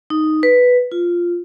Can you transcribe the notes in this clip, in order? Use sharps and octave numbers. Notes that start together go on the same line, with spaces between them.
D#4
B4
F4